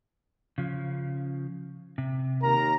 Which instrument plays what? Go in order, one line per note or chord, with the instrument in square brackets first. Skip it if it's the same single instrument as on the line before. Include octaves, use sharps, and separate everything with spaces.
[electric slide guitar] C#3 F3
C3
[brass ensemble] D#2 A#4 A#5